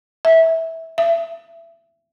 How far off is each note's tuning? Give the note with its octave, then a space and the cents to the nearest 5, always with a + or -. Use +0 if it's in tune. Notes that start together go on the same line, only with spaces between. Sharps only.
E5 -20
E5 +25